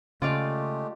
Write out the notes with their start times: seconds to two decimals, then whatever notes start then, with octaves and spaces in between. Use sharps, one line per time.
0.22 C#3 G#3 A3 F4 G4 D5 F5